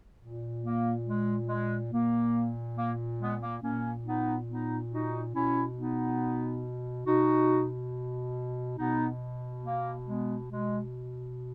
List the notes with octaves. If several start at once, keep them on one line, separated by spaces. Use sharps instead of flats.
A#2
A#3
G#3
G#3
A#2 A#3
A#3
G#3 B3
A#3
A#2 A#3 C#4
B3 D#4
B3 D#4
D#4 F#4
B2 C#4 E4
B3 D#4
B2 D#4 F#4
B2 B3 D#4
A#3
G#3 B3
B2 G#3